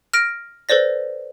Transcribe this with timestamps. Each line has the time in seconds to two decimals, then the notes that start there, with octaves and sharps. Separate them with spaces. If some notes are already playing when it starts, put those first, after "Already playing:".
0.14 F6 A#6 D7
0.69 A4 B4 C5 D5 A#6